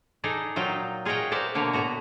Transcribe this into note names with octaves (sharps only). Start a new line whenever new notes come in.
D#4 G#4 A4 D5
A#2 F#3 D#4 F4 G5
F4 G#4 C#5 D#5 F#5 G5
A#4 C5 D5 E5 F#5
B2 D3 A#3 C#5 F5
A2 B3 F#4 A#5